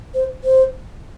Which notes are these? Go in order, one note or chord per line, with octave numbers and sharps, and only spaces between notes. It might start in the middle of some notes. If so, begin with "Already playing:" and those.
C5
C5